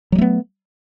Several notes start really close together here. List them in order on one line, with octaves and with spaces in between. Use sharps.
F#3 G3 A3 B3